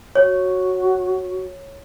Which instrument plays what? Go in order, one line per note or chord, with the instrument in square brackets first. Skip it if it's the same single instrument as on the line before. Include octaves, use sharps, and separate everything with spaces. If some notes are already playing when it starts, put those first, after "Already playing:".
[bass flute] F#4 [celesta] C#5